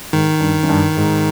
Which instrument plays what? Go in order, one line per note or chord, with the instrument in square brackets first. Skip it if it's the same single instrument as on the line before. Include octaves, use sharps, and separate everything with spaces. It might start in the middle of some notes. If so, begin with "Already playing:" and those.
[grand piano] G#2 [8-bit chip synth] D#3
[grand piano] G2
F#2
G2
G#2